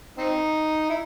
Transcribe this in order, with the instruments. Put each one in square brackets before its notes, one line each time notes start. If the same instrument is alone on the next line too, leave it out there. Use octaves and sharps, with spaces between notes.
[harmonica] C4 D#4
E4